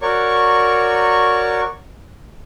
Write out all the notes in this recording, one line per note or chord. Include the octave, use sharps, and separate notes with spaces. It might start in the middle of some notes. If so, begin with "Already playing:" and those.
F#4 A#4 C#5 D5 C#6